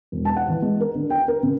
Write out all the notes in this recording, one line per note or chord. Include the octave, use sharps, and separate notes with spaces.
E1
A5
F#5
E3
G#3
A#4
D3
G5
A#4
C#3